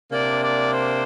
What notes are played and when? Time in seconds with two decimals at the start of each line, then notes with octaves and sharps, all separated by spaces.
0.12 C3 A#3 D4 D5
0.41 D5
0.71 C5